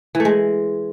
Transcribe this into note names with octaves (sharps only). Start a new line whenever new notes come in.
E3
A3
G#3